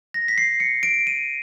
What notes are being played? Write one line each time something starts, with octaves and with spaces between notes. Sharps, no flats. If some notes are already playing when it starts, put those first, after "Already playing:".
A#6
B6
C7
C#7
D7
D#7